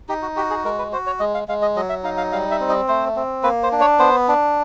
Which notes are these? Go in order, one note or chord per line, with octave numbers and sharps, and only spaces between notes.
D#4 G4
F#4
F#4 G4
G#4
G#3 A#4
B4
F#4 C5
C#5
G#3 D#5
F5
G#3 F5
D#5
F#3 D#5
E5
D#4 F5
F5
G3 F5
E5
C4
D#5
A3 C5
C4
A#3 B4
C5
D4
C#5
B3 C5
D4